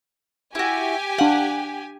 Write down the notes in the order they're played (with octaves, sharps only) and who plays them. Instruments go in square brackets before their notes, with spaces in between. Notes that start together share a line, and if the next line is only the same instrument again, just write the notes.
[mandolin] E4 F#4 [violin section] G4 G#5
[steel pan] D4 F5 [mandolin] F#5